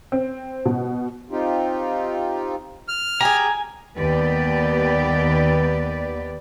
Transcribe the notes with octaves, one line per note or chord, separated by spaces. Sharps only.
C4
B2
C4 D#4 F4 G4
F6
G4 G#4 G#5 A#5
D#2 B3 G4 B4 D5